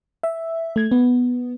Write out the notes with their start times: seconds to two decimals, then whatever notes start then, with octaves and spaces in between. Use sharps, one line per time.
0.23 E5
0.76 A3 G#6
0.91 B3